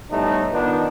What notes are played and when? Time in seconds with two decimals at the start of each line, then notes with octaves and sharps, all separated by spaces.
0.11 A2 G3 A3 B3 D#4
0.52 D#3 B3 D4 D#4 F4